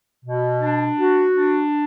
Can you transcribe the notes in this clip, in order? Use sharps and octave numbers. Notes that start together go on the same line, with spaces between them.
B2
D4
F#4
D4